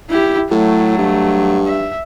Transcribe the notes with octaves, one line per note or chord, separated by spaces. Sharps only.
E4 G4
A2 F#3 A3
G2
E5